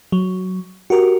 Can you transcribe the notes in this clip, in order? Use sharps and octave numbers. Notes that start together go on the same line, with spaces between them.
F#3
F#4 G4 A#4